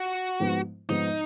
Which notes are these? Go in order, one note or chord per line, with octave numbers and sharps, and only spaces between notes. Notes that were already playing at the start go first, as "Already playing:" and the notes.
Already playing: F#4
G#2 F3 B3
G#2 F3 B3 D#4